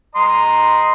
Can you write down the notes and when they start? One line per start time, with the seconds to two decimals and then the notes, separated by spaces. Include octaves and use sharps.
0.15 D#5 A#5 C6